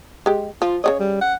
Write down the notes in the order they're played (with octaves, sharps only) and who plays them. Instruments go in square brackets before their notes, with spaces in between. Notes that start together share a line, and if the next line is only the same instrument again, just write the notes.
[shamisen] G#3 G4
[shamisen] F3 [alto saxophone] F4
[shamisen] C#3 G#4 D#5 [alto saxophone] C#5
[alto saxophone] G3
F#5